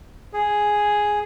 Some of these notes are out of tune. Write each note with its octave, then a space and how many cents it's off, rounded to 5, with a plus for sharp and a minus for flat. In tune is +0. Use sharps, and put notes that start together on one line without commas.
G#4 +0